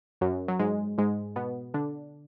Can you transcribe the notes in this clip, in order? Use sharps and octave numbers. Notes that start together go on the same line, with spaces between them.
F#2 F#3
F#3
G#2 G#3
G#2 G#3
B2 B3
D3 D4